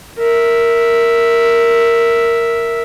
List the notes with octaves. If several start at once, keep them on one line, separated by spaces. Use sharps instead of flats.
A#4 E5